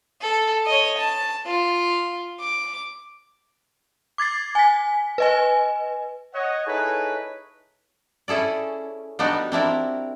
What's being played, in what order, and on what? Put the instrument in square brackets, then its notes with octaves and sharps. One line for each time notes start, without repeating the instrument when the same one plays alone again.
[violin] A4
C#5 D#5
A5
F4
D6
[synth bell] D6 G#6 A6 C7
G#5 B6
B4 D#5 G#5
[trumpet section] C#5 D#5 F#5
D#4 E4 G#4 A4 B4 C#5
[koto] C#4 E4 G#4 A4 D5
G3 B3 D4 D#4 F#4
C4 D4 E4 A#4